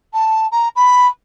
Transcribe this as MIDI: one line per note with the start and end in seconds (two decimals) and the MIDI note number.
0.13 0.47 81
0.51 0.68 82
0.76 1.07 83